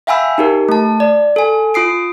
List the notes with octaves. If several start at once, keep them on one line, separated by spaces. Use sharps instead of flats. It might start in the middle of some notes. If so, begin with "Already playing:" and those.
E5 F5 G5 G#5 B5 E6
D#4 G4 A#4
A3 A5
D5
A4 G#5
F4 D#6 C7 D7